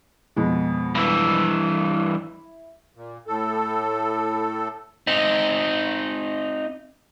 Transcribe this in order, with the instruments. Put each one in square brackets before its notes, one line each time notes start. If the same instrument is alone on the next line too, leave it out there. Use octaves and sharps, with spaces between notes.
[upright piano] F2 B2 G#3
[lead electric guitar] G2 E3
[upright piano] E4
[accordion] A#2
A2 A4
[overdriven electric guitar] C4 D#4